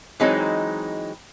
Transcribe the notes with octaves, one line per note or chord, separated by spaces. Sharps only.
E3 F#3 G#3 C4 D#4